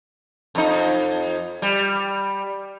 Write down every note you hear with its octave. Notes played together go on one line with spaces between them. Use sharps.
F2 D#4
G3